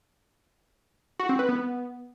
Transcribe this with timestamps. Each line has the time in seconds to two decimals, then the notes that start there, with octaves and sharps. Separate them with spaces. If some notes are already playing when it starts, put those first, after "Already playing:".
1.20 F#4
1.29 C4
1.39 B4
1.49 B3